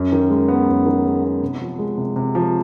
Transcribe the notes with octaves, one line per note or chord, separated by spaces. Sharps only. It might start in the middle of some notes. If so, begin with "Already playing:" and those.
Already playing: F#2
D#3
G#3
B3
F#2
D#3
G#3
B3
C3
F3
G#3
C3
C3
F3